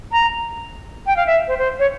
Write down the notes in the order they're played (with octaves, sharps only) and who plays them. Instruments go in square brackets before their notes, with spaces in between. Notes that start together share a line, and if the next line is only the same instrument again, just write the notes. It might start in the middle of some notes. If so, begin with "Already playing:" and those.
[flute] A#5
G5
F5
E5
C5
C5
C#5